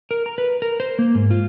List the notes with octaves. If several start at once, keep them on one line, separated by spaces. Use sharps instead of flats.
A#4
A#5
B4
A#4
C5
A#3
G#2
F4